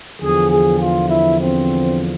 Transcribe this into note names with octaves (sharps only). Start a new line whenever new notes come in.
E2 D3 F3 G#4
G#4
F4
E4
C4